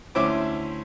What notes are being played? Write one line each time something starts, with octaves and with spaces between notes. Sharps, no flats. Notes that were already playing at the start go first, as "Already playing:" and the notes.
D2 C#4 E4 C5 D6